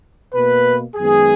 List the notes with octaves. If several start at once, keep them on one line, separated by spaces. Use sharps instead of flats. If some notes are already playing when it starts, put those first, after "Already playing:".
B2 A#3 B4
F#2 D#3 G#3 B3 G#4